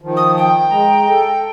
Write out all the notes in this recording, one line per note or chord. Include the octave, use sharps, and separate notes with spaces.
D#3 F3
D#6
G5
G#3 A#5
A4